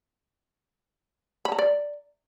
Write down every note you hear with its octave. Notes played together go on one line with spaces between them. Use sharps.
B5
A#5
D5